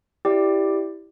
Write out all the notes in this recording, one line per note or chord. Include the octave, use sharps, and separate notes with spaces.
E4 G4 D5 G5